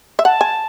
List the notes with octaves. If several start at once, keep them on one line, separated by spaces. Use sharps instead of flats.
E5
F#5 A5
G#5